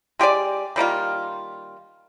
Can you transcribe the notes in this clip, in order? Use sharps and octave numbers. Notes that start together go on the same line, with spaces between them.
G#3 G4 G#4 D5
D#3 G3 A#3 F4